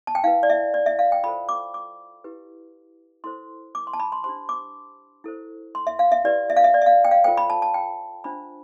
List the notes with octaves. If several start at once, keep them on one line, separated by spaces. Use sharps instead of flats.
A5
G5
E4 B4 F5
D5
E5
D5
E5
F5
G5
F4 A4 C5 B5
D6
D6
E4 G4 B4
E4 A4 C5 C6
D6
C6
A5
B5
C6
D4 G4 C5 C6
D6
E4 A4 C5
C6
E5
F5
E5
E4 G4 B4 D5
E5
F5
E5
D5
E5
F5
G5
F5
F4 A4 C5 G5
B5
A5
A5
G5
D4 F4 C5 B5